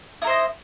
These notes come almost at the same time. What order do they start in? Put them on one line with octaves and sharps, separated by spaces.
E4 A#4 C5 D#5